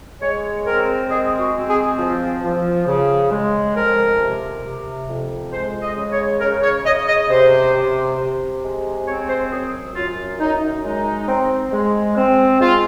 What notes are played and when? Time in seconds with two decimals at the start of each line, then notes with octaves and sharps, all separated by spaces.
0.21 G#3 C#5
0.66 C4 A#4
1.10 G#3 G#4
1.40 F#4
1.54 C4
1.69 G#4
1.99 F3
2.43 F3
2.86 C#3
3.31 G#3
3.75 F2 A#4
4.20 C3
4.63 C3
5.08 F2
5.53 G#3 C5
5.82 D#5
5.96 C#3
6.12 C#5
6.40 C#3 A#4
6.63 C#5
6.85 C#3 D#5
7.08 D#5
7.29 C3 C5
7.73 C3
8.17 C3
8.63 G#3
9.07 C4 C#5
9.28 C5
9.51 F#2 G#4
9.94 F#2 F4
10.39 F#2 D#4
10.84 G#3 D#4
11.28 C4
11.72 G#3
12.16 C4
12.60 G#3 F4